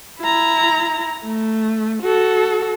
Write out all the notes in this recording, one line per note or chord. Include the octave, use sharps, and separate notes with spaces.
E4 A#5
A3
F#4 A4